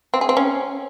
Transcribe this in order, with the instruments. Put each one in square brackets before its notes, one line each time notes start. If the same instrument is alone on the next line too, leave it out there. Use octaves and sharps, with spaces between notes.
[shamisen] C4
G#4
C4
C#4